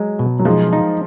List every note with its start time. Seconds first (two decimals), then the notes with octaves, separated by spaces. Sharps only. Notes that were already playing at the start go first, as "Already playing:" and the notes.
Already playing: F#3 G#3
0.19 B2
0.39 F#3
0.45 F3 G#3 D#4
0.73 D#4